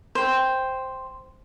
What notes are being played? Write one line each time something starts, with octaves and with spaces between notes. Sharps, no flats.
C5 G5